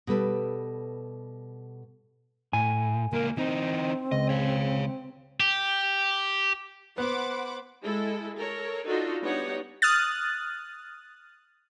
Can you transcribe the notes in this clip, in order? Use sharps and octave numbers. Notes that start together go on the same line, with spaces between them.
B2 G3 A4 B4
A2 G#5
C#2 A#3 A#4
E3 C4 D#4
C#2 D#5
C#5 F5
G4
B3 C5 F#5 B5 D6
G#3 E4 A4
A4 A#4 C#5
D4 D#4 F4 F#4 A4
G3 B3 D4 D#4 C#5 F#5
D#6 F6 F#6 A6